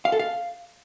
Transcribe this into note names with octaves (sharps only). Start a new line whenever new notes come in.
F5
A4
F5